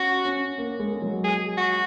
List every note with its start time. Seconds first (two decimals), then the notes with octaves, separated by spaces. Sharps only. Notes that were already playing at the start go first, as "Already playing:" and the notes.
Already playing: C#4 F#4
0.25 C#4
0.58 A#3
0.80 G#3
0.91 G#3
1.02 F#3
1.24 G#4
1.57 F#4